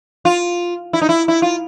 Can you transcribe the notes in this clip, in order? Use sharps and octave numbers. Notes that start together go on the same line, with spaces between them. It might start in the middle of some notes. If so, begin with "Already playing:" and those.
F4
E4
D#4
E4
E4
F4